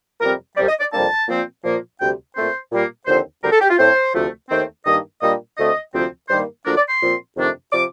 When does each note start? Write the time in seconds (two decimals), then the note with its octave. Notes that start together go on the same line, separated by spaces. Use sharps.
0.20 F2 C3 G3 C4 A#4
0.56 C2 C3 G3 D5
0.68 D#5
0.80 D5
0.92 F2 C3 G3 A#3 D4 A5
1.27 A#2 F3 C4
1.63 A#2 F3 A#3
1.99 D2 C3 G3 G5
2.35 A#2 A3 C4 C5
2.71 A#2 G3 A#3
3.07 D#2 D3 F3 C4 C5
3.42 D2 D3 G3 C4 A#4
3.51 A4
3.60 G4
3.69 F4
3.78 A2 A3 C4 C5
4.14 D2 C3 F3 A3
4.50 D#2 D#3 A3 C4
4.85 G2 D#3 A#3 D4 D#5
5.21 A#2 G3 A#3 D4 D#5
5.57 D2 D3 A3 C4 D#5
5.93 D2 C3 F3 C4
6.29 G2 D#3 G3 A#3 C5
6.65 D2 D3 F3 A#3 D4 A#4
6.77 D5
6.88 C6
7.00 A#2 F3 C4
7.36 F2 C3 D#3 A3 D4
7.72 C3 F3 D6